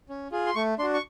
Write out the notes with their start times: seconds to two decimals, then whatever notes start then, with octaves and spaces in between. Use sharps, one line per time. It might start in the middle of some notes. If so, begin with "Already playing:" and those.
0.09 C#4
0.32 F4 G#4
0.46 C6
0.55 A3 C#6
0.79 D4 C6
0.83 F#4
0.94 C#6